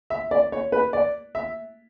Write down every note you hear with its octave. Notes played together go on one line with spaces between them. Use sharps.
E5
D5
C#5
B4
D5
E5